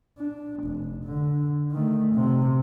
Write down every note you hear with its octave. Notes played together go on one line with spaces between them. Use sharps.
D4
F1
D3
D#3 A3
C3